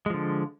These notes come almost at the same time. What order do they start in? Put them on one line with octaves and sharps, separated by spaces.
G#3 F3 D3